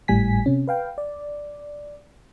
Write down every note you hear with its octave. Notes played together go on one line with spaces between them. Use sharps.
G#1 A2 G3 G#5 B6
C3 C#4
B4 F5 G5
D5